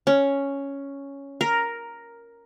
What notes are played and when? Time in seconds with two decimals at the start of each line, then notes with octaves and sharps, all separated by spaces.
0.07 C#4
1.41 A#4